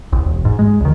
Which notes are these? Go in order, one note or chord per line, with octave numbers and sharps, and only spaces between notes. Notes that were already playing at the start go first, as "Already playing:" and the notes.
C2
E1
G#2
G#3
C#2 D#3